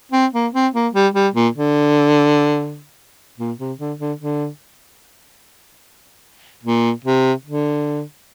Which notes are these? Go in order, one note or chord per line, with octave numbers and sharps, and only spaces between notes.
C4
A#3
C4
A#3
G3
G3
A#2
D3
A#2
C3
D3
D3
D3
A#2
C3
D3